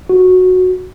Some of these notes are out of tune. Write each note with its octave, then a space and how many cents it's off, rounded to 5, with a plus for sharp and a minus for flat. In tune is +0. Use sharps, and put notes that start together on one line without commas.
F#4 -10